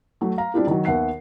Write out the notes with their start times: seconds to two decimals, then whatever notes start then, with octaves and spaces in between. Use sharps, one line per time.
0.21 F#3 A3
0.38 F5 A#5
0.54 G3 C4 D4 E4 F4 G4
0.67 D#3 F#3
0.85 D#2 B3 E5 F#5 C7